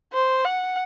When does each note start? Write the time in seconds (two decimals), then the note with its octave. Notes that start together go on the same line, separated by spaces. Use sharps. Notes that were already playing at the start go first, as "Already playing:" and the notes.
0.13 C5
0.45 F#5